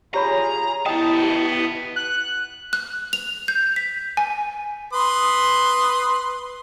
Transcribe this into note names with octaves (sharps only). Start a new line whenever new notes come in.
F4 G4 G#4 C#5 A#5 B5
B3 E4 G4 D#5 G5 A5 D#6
F#6
F#6
F7
G6
B6
G#5
B4 C6 D#6